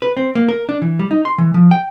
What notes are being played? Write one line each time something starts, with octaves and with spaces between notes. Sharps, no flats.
B4
C4
A#3
A#4
D4
E3
G3
D#4
C6
E3
F3
G5